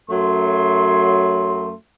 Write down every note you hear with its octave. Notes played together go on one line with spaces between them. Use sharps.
F#2 F#3 A3 C6